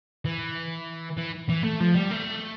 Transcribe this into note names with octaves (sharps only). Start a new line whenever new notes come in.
E3
E3
E3
A3
F3
G3
A3